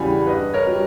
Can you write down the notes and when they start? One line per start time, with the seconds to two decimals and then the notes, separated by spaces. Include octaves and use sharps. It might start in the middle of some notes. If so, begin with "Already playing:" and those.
Already playing: E2 C#3 E3 G3 G#5 B5
0.26 G2 B4 D#5
0.54 A#4 C#5
0.67 G3